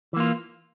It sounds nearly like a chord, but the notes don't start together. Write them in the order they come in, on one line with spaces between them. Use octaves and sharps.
E3 A#3 F4